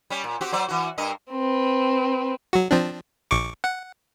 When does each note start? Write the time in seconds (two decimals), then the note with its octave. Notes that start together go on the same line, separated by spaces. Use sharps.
0.10 G3 C#4
0.24 A#2
0.41 C4 F#4 G4
0.52 F#3 C5 D5
0.68 E3 F#4
0.98 G2 A#4 D#5
1.31 C4 B4
2.53 F#3 F#4
2.71 F3 C4 D4
3.31 A#1 C#6 D6
3.64 F#5